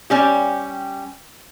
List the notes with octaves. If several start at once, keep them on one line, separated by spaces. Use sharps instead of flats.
G3 C#4 G4